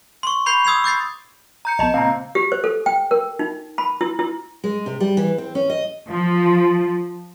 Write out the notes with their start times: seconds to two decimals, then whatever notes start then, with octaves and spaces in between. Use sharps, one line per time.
0.23 C6 C#6
0.46 B5 C#6 G6 C7
0.65 D#6 E6 G#6 C7 F7
0.84 D6 G6 A6 C7
1.65 A#5 G6 C#7
1.79 A#1 B3 D#5 A5
1.94 C#2 A#2 C4 F5 A#5
2.35 G4
2.52 C5
2.64 A4
2.86 G5
3.11 A#4
3.39 D#4
3.78 B5
4.01 E4
4.19 E4
4.64 G#3
4.86 C3
5.00 G3
5.17 E3
5.38 C4
5.55 C#4
5.70 D#5
6.08 F3